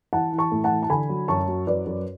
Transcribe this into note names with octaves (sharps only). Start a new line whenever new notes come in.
E3 F#5 A5
E3
A5 C#6
A2
F#5 A5
E3
A5
D3 G#5 B5
F#3
F#2 A5 C#6
F#3
F#2 B4 D5
F#2